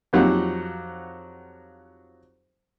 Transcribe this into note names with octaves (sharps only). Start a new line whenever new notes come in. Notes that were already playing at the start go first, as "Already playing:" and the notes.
F2 F3 F#3 D#4 G4 F#5